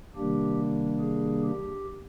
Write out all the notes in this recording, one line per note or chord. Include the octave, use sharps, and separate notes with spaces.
C3 D#3 G3 A#3 D4 G4
G#4
G4